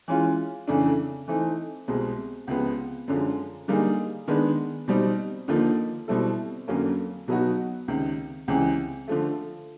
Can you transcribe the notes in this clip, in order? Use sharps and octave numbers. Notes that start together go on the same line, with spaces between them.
E3 G#3 C#4 F4
F2 C#3 E3 A3 D4
E3 A3 C4 D#4
C2 B2 G#3 C4
C#2 C3 F3 G#3 B3
F#2 D3 F3 G#3
D3 G3 A#3 D#4 G#4
D#3 G#3 B3 D4
B2 G3 C4 D#4
D#2 D3 F3 A#3 D#4
B2 G3 C4 E4 A4
F2 D3 F#3 A#3 C#4
B2 F#3 B3 D#4 F#4
C#2 C3 D#3
C#2 C3 E3
D3 F3 A3